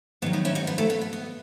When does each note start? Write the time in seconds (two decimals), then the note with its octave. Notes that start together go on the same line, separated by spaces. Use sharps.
0.22 G#2 D#3 F#3 B3
0.33 B3 D#4
0.45 C#4 E4
0.55 D#4 F#4
0.67 B3
0.78 A3
0.90 B3
1.01 B3
1.13 B3